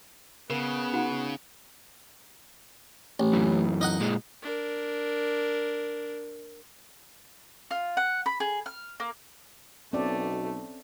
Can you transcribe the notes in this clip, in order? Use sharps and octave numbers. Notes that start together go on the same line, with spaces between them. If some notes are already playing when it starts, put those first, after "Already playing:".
C#3 B3 A#4
D#4 F#4 F#5
A1
F#2 E3
D#4 D#5 F#5
A#2 G#3
D4 A#4
F4
F#5
B5
G#4
F6
A#3
B1 B2 A3 C4 C#4 D5